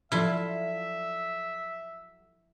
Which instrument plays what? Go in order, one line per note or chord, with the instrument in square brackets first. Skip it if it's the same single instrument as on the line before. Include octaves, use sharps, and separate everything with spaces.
[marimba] F3 [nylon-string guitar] F#3 A4 D5 [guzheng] E4 F4 [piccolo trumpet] E5